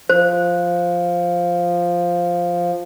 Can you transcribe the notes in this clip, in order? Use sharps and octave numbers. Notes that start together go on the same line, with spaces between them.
F3 C5